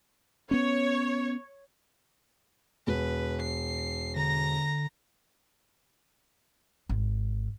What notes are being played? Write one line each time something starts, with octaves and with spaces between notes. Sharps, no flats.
B3 C#4 C#5
E1 B4
C7
D3 A#5 A#6
G#1